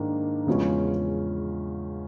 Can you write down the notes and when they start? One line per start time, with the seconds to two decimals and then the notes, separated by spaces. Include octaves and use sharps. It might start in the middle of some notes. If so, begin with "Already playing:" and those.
Already playing: G#2 D#3 A#3 D4
0.47 E2 C#3 F3 G#3 C#4